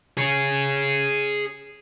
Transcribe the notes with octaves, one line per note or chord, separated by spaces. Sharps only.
G#4 C#5